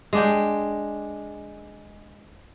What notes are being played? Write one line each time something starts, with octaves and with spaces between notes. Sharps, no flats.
G#3 D4 G5